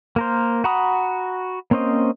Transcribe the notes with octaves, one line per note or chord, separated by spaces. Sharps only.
A#3 A#4 C5
F#4 F#5 A#5 B5 D#6
A#3 C4 C#4 C5 D#5